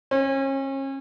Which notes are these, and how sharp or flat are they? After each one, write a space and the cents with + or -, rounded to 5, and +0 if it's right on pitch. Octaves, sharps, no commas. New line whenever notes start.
C#4 -35